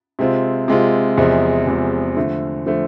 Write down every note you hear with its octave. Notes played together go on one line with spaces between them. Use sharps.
C3 G#3 C4 F4
C3 G#3 C4 F4
E2 C3 F3 G#3
E2 C3 F3 G#3
D3 F3 A3
D3 F3 A3